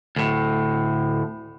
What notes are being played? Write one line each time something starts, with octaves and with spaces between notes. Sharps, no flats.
D2 A2